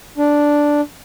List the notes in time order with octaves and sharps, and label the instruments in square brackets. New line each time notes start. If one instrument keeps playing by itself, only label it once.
[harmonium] D4